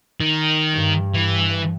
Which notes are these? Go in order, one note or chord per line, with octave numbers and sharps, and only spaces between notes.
D#3
G2
E3